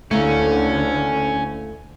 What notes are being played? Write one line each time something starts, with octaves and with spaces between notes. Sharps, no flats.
D2 D3 A3 A#3 C#4 E4